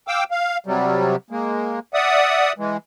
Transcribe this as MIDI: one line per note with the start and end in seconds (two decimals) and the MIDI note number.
0.08 0.24 77
0.08 0.24 79
0.08 0.24 86
0.08 0.24 88
0.31 0.58 77
0.67 1.16 48
0.67 1.16 54
0.67 1.16 55
1.31 1.79 56
1.31 1.79 58
1.94 2.53 74
1.94 2.53 76
1.94 2.53 78
1.94 2.53 87
2.58 2.77 52
2.58 2.77 56